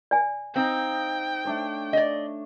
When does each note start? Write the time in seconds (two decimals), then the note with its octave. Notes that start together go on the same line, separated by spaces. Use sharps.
0.11 D5 G#5
0.56 C4 D#4 D#5 F5 G5
1.45 A3 D4 C#5
1.93 D5 D#5